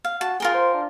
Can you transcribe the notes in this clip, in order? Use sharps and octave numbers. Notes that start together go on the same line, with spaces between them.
F5
F#4 A5
F4 G#4 A#4 G5
C5
D4